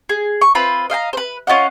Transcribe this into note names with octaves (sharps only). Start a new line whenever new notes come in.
G#4
C#6
C4 F4 B4 B5
D#5 F5 G5 A#5
B4 C5
C#4 F4 D#5 F#5